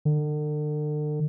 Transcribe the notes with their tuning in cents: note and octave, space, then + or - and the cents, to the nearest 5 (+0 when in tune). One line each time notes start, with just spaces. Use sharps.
D3 +40